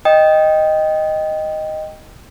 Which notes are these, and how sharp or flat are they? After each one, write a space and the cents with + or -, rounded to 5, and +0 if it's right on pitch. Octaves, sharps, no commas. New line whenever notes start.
D#5 +0 G5 +0 D#6 +0